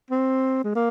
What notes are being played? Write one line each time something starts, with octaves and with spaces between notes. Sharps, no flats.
C4
G#3
A#3